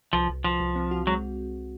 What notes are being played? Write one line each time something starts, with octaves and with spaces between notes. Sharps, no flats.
C2 F3
C2
C2 F3
C2
C4
F#4
F#3 G#3